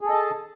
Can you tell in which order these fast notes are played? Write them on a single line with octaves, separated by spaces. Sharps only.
G#4 A4 D#5 A5